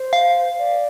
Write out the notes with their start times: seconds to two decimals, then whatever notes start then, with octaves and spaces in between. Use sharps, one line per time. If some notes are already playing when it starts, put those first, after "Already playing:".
Already playing: C5
0.13 F5
0.58 D5